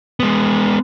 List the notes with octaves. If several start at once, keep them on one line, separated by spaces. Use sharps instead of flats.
G#3 B3